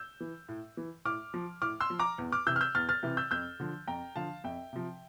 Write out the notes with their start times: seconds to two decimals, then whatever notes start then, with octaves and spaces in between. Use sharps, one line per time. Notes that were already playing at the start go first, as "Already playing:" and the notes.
Already playing: E6 G6
0.20 E3
0.49 A2
0.77 E3
1.05 A2 D6 F6
1.34 F3
1.62 A2 D6 F6
1.81 C6 E6
1.90 F3
1.99 A#5 D6
2.18 E2
2.32 D6 F6
2.47 C3 E3 E6 G6
2.56 F6
2.61 E6 G6
2.75 E2 F6 A6
2.89 F6 A6
3.03 C3 E3
3.17 E6 G6
3.31 F2 E6 G6
3.60 D3 F3
3.88 F2 G5 A#5
4.16 D3 F3 F5 A5
4.44 F2 E5 G5
4.73 C3 F3